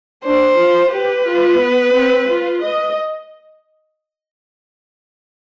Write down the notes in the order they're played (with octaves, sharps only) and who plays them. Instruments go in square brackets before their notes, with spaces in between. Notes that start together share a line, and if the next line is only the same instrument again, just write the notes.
[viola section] D4 [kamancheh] C5
[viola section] F4
[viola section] G4 [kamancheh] B4
[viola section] F4
B3
C4
F4
D#5